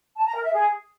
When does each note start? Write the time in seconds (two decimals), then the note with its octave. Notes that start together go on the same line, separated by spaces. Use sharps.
0.16 A5
0.25 A#5
0.35 A#4
0.44 E5
0.53 G#4